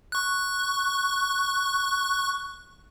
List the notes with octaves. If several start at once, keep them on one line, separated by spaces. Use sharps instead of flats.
C#6 F#6